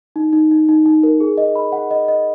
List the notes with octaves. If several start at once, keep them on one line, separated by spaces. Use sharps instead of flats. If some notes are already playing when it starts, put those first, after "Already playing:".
D#4
D#4
D#4
D#4
D#4
A#4
G#4
D#5
B5
F#5
D#5
D#5